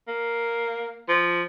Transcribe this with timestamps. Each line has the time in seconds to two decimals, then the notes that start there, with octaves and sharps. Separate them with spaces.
0.08 A#3
1.09 F3